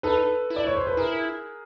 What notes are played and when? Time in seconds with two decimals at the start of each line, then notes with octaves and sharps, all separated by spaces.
0.03 D#4 A4 B4
0.50 E4
0.56 D5
0.67 C#5
0.77 C5
0.87 B4
0.97 E4 G#4 A#4